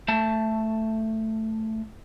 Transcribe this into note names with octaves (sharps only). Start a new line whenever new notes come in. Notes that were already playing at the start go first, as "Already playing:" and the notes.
A3 A5